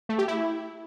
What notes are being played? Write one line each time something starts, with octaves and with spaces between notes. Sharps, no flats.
A3
G4
E4